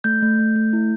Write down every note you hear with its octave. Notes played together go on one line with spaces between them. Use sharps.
A3 G6
A3
A3
A3
E4